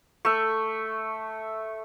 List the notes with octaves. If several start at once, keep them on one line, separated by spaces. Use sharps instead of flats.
A3 E5